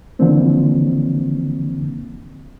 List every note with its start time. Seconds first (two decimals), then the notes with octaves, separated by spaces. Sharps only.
0.19 D3 E3 F3 A#3 C4 D4